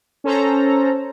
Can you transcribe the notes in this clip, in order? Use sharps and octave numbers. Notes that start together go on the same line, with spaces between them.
C#4 A4 C5 A#5